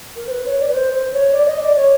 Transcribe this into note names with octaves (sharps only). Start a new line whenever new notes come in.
A#4
C5
B4
C#5
D5
B4
C5
C5
C#5
D5
D#5
D5
C#5